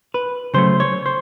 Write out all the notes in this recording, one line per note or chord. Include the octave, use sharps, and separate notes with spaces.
B4
C#3 F#3 A3 C5
C#5
C5